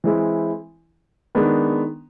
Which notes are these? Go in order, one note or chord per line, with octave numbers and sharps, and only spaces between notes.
E3 G#3 C4 E4
D#3 G#3 B3 D4